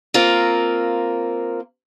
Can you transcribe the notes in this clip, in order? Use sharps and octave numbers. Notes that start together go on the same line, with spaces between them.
A#3 C4 F4 A#4